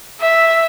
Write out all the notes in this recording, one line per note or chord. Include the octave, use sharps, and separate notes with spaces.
E5